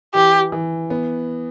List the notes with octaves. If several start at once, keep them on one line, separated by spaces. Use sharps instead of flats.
E3 G4
E3
B3